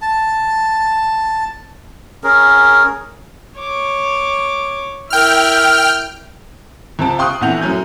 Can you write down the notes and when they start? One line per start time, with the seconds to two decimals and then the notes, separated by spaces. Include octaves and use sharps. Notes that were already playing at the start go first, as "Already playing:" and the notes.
0.02 A5
2.24 C#4 G#4 A#4
3.58 C#5 D6
5.10 E4 A#4 G5 F6
6.99 C#2 C3 C5 A5 D7
7.18 F5 G5 C6 C#6 D#6 F#6
7.41 A#1 F2 E3 F#5 G6 F7
7.61 F#2 A2 F#3 G#5 G6